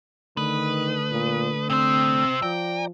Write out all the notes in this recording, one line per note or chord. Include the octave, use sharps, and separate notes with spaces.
D3 D#3 A3 B4 D#6
A#2
C3 C4 C5 E6
F3 D5 G5 A#5